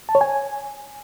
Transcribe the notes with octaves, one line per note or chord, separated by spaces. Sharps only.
A5
C#5
G#5